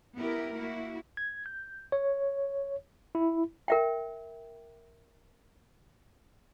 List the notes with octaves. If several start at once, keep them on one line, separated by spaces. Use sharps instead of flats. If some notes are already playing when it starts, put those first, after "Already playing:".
B3 E4 G4 A#4
A#3 E4 F#4
G#6
G6
C#5
E4
A#4 E5 G5